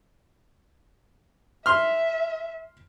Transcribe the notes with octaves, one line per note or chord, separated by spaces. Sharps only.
E5 C6 F6